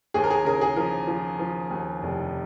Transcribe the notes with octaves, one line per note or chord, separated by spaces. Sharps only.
D#2 G#4
A#4
G#4
C#3 A#4
G#4
F3 A#4
F3
F3
D#2
F1